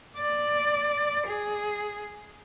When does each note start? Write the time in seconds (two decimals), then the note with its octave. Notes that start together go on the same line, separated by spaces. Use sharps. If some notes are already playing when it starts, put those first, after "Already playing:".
0.17 D5
1.27 G#4